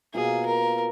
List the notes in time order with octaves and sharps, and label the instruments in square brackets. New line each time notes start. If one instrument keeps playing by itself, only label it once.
[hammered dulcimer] B2 A#3 F4 [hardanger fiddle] G#4
[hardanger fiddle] A#4